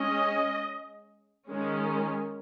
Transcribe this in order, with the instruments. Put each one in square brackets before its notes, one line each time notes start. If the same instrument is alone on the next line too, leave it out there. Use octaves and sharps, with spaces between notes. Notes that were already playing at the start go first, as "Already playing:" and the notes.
Already playing: [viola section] G#3 C#4 D#5
D#3 G#3 C#4